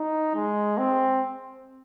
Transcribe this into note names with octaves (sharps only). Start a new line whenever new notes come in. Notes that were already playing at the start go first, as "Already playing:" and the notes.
Already playing: D#4
G#3
C4